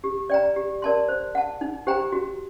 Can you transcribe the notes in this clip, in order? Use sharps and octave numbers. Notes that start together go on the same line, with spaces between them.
G4
D5 G5 A#5
G4
A#4 D5 A5 C6
C5
F#5 A5
D#4
G4 C5 G5 A#5
F#4